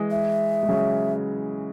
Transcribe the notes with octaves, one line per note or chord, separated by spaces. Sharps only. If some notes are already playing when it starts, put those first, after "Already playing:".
Already playing: E3 G#3
E5
G#3
C#3 F#3